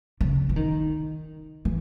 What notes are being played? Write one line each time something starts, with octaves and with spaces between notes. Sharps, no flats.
C#3
E3
D#3
E3